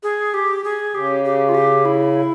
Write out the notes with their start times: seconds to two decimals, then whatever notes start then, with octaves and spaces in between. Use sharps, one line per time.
0.03 G#4
0.34 G4
0.64 G#4
0.95 C#3 G4
1.25 G4
1.49 F4
1.55 G4
1.85 E4